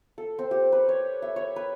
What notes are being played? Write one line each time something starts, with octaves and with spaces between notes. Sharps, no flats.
A4
C4
G4
B4
C#5
E5
C#5
B4